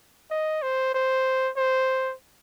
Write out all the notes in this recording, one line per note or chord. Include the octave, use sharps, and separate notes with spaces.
D#5
C5
C5
C5